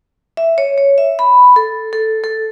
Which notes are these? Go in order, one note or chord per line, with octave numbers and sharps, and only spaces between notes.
E5
C#5
C#5
E5
B5
A4
A4
A4